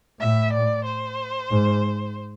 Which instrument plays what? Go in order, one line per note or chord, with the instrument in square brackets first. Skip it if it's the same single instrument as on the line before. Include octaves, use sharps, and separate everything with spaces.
[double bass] A2 [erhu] E5
[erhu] D5
C5
[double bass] G#2